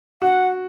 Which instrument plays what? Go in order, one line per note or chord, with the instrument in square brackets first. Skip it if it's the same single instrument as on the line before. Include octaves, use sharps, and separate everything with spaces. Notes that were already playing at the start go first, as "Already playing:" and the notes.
[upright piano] F#4 [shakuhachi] F#5